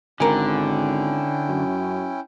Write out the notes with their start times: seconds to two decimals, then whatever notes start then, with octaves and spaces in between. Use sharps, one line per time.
0.20 G#1 D3 C#4 E4 A#4 G5 G#5
1.49 F#2